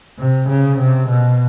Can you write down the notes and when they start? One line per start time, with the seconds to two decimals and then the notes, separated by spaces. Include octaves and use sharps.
0.19 C3
0.49 C#3
0.79 C3
1.09 B2